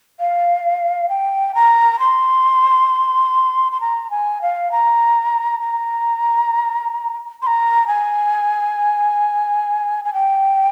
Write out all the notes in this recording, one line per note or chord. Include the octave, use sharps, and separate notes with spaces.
F5
G5
A#5
C6
C6
A#5
G#5
F5
A#5
A#5
C6
A#5
G#5
G#5
G5